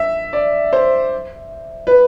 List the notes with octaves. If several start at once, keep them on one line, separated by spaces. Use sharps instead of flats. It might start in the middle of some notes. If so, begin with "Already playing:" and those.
Already playing: E5
D5
C5
B4